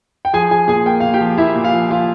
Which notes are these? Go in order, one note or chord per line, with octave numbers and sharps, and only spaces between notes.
G5
F3 G#4 G#5
F3 G#4 G#5
A#2 G#4 G#5
A#3 G5
A#2 F5
G4 G5
F3
A#3 E4 E5
A#2
F4 F5
F3
F3 F4 F5